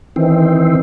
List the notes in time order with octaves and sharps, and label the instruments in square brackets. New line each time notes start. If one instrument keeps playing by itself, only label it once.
[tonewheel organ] D#3 E3 C4